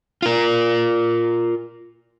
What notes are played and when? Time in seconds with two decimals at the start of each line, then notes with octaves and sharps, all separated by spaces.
0.22 F4 A#4